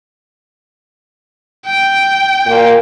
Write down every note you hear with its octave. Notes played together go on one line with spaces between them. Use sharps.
G5
A#2